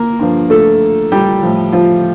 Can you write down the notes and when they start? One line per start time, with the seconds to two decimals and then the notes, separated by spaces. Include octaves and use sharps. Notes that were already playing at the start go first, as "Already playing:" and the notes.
Already playing: A#3 A#4
0.19 G2 D3 F3
0.50 A3 A4
1.12 G3 G4
1.43 A2 F3
1.72 F3 F4